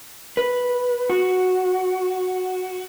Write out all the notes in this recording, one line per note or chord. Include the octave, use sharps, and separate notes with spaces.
B4
F#4